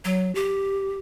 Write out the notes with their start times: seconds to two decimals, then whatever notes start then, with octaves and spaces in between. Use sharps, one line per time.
0.05 F#3
0.35 G4